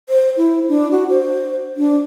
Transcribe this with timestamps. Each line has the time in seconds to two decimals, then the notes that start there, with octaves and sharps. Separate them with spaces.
0.09 C5
0.37 E4
0.69 D4
0.91 F#4
1.10 C5
1.77 D4